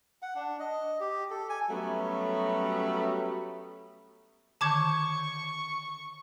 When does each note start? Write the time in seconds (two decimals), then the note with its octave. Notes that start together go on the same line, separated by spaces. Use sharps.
0.22 F#5
0.35 D4
0.59 D#5
1.00 G4
1.30 A4
1.49 G#5
1.70 F#3 G3 A3 B3 C#4 F#4
4.61 D3 D#3 A5 C#6 D6 G6 G#6